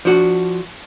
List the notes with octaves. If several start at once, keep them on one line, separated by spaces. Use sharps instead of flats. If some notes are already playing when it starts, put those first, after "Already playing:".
F3 D4 F#4